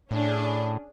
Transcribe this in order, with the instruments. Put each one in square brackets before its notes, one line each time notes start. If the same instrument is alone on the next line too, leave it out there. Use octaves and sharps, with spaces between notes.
[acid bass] A2 [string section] C#4 D4 G#4